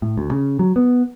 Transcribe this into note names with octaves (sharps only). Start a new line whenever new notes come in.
A2
D2
C#3
F#3
B3